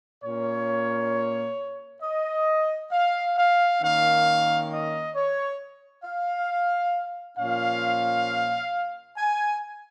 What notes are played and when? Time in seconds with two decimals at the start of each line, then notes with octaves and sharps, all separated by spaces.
0.24 A#2 A#3 C#4 C#5
2.02 D#5
2.92 F5
3.37 F5
3.81 D#3 A#3 C#4 F5
4.71 D#5
5.15 C#5
6.04 F5
7.38 A#2 F3 C#4 F5
9.17 G#5